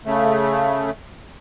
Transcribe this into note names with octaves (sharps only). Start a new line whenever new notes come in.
C#3 A3